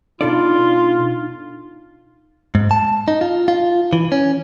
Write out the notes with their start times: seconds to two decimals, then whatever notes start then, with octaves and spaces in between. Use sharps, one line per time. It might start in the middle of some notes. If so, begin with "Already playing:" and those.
0.21 B2 D4 D#4 F4 A4 D5
2.55 G#2
2.71 A5
3.08 D#4
3.21 F4
3.48 F4
3.93 E3
4.12 C#4